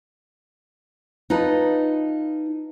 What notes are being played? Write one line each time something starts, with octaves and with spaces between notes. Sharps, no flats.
D#4 F4 A4 B4 D#5